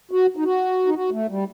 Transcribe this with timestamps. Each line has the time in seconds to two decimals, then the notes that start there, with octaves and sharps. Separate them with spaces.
0.11 F#4
0.37 D#4
0.45 F#4
0.87 D#4
0.95 F#4
1.12 A3
1.29 G3